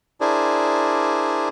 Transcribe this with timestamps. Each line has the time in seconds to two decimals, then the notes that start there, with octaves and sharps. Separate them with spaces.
0.21 D4 E4 G#4 A#4 C5 D5